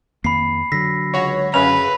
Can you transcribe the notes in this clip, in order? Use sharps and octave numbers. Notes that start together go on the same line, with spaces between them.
F2 D#3 A#3 B5 C7
D3 F#3 E6 A#6 B6
C#2 F#4 C#5
F#2 C#3 C#4 B4 F7